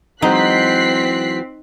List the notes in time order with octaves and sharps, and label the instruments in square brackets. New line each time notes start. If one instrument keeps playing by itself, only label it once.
[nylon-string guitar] E3 F#3 G#3 [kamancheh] C4 [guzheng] D#4 [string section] F#6 B6 C7